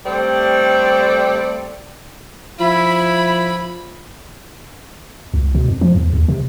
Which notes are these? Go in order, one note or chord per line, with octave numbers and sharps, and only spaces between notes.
G3 A3 C4 A4 D5
F3 E4 B5
C#2
B2
F2
F3
E2
D#2
C3